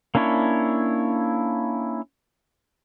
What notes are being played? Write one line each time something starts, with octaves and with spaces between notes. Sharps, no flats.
A#3 C#4 D4 E4 C#5